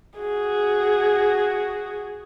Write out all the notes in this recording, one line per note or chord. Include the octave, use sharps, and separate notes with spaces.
F#4 G#4